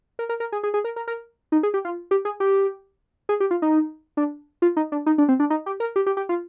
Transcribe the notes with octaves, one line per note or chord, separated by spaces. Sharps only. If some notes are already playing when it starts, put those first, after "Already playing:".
A#4
A#4
A#4
G#4
G#4
G#4
A#4
A#4
A#4
D#4
G#4
G4
F4
G4
G#4
G4
G#4
G4
F4
D#4
D4
F4
D#4
D4
D#4
D4
C4
D4
D#4
G4
A#4
G4
G4
G4
F4